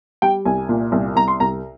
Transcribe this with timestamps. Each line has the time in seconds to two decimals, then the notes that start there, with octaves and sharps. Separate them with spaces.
0.22 G3 G5
0.45 C2 G#5
0.69 A#2
0.92 C2
1.16 C2 A#5
1.28 C6
1.40 C2 A#5